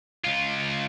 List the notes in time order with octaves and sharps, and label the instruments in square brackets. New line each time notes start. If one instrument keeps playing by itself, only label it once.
[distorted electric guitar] C#2 F4